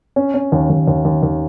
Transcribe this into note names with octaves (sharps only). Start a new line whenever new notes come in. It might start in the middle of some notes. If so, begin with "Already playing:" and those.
C#4
C#4
D#2
D#2
D#2
D#2
D#2